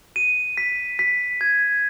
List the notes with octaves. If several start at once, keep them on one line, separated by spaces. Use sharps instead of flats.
D#7
B6
B6
G#6